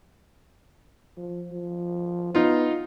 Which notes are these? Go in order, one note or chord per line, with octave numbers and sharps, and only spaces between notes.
F3
F3
B3 D#4 F4